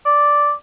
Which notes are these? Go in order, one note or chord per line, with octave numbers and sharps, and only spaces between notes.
D5